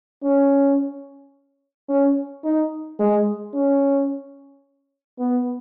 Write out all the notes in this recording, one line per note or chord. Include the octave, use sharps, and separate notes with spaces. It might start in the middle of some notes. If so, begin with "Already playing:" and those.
C#4
C#4
D#4
G#3
C#4
B3